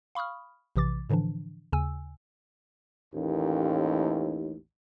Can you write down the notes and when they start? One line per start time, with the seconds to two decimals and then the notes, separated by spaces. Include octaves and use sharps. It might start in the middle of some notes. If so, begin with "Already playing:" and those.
0.15 F5 B5 C#6 D#6 F6
0.76 A#1 C3 E3 D6 A6
1.10 A2 D3 E3 F3 D4
1.72 D#2 C#3 G#5 E6
3.14 A1 D#2